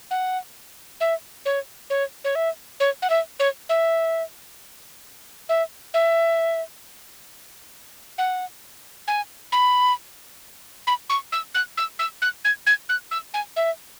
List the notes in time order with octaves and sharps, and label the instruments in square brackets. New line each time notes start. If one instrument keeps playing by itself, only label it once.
[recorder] F#5
E5
C#5
C#5
C#5
E5
C#5
F#5
E5
C#5
E5
E5
E5
F#5
G#5
B5
B5
C#6
E6
F#6
E6
E6
F#6
G#6
G#6
F#6
E6
G#5
E5